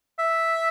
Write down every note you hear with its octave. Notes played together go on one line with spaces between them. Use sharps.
E5